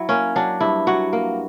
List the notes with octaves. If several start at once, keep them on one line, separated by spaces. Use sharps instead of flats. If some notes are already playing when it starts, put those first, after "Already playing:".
Already playing: F#3 E4
A#3 C#4
F#3 D4
G2 E4
F#3 F#4
A#3